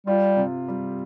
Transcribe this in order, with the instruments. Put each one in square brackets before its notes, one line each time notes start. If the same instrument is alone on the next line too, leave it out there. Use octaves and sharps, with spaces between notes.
[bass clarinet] G3 [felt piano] F4
[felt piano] C3
G3